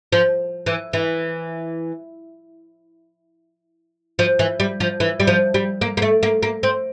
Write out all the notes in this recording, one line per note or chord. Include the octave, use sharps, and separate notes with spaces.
F3
E3
E3
F3
E3
G3
F3
E3
G3
F3
G3
A#3
A#3
A3
A#3
A#3
C4